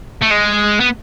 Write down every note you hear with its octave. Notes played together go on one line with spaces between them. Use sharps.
A3
G#3
B3